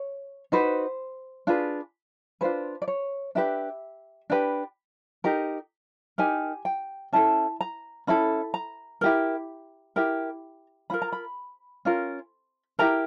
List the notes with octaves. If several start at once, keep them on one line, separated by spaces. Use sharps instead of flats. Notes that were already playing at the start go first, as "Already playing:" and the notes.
Already playing: C#5
D#4 F#4 B4 C5
D4 F4 G#4 B4
D4 F4 G#4 B4 C5
D5
C#5
D4 G4 B4 E5
D4 G4 B4
D#4 G4 A#4
D#4 G4 A#4 G#5
G5
C#4 E4 A4 A5
A#5
C#4 E4 A4 B5
A#5
E4 G4 A#4
E4 G4 A#4
C#4 F4 A#4 B5
A#5
B5
C#4 F4 A#4
E4 G4 A#4 A#5